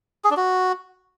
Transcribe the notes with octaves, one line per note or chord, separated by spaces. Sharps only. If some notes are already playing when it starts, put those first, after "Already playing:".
G#4
D4
F#4